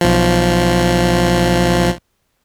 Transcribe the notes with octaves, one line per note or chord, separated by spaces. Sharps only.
B1 F3